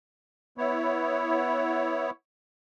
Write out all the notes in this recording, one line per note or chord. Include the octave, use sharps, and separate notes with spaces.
B3 E4 C#5